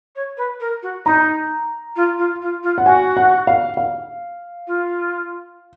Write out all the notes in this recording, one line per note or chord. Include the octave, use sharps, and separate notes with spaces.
C#5
B4
A#4
F#4
D#4 A#5
F4
F4
F4
F4
F#5
F#4 G#5
F#5
F5
F5
F4